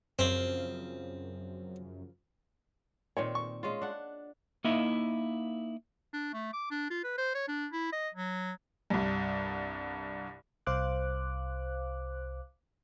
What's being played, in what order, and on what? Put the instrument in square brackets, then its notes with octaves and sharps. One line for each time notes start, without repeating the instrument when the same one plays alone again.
[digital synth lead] F#2 [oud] C#3 F3 [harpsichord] C4
[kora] A#2 D#3 C4 [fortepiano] C#5
[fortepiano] C#6
[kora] G#3 C#4 F4
D4 F#5
[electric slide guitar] A#3 D#4 E4 D#5 E5
[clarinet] D4
A3
D6
D4
F4
B4
C5
C#5
D4
E4
D#5
F#3
[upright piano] C2 G2
[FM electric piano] C2 C5 F5 D6 F#6